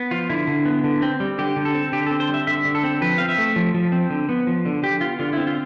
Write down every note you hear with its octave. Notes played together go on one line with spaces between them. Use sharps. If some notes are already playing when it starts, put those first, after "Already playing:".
Already playing: B3
F3 F4
D3 E4
D3
B3
D3
C4
G3
D3 G4
D3
A4
C4
D3 G4
C4 A4
C5
G3 E5
D3 E5
D3
A4
C4
F3 B4
C4 F5
E5
A3
F3
F3
C4
D3
B3
F3
D3
D3 G4
B3 F4
D3 F4
C4 E4
F4